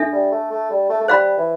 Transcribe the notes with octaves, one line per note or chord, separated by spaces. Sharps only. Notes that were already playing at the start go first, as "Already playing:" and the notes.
Already playing: D4 A4 E5
G3
A3
A3
G3
A3
A3
G3 C5 F5 B5
E3